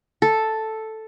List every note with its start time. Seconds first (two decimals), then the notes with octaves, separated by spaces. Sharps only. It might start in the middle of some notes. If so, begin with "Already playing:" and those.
0.22 A4